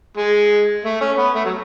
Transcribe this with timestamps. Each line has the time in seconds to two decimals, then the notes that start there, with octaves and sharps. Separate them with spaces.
0.17 G#3
0.85 A3
1.01 C#4
1.18 B3
1.35 A3
1.45 F#3